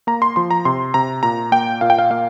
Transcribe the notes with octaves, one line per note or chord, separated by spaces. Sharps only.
A#3 A#5
C6
F3 C6
A#5
C3 C6
C3 A#5
A#2 A#5
A#3 G5
A#2 F5
G5
F5
A#3 F5